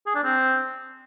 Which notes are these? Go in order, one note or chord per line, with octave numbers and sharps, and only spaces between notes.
G#4
D4
C4